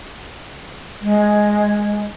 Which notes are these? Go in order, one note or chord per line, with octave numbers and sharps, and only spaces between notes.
G#3